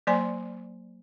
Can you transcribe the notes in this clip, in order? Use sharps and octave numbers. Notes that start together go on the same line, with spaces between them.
F#3 A#3 C5 D5 G#5 C6